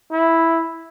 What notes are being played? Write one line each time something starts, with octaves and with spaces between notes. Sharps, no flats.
E4